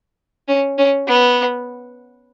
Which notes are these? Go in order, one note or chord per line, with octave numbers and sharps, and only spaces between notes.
C#4
C#4
B3